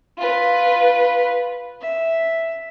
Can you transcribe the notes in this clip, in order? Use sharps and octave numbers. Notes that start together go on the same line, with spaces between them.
F4 B4
E5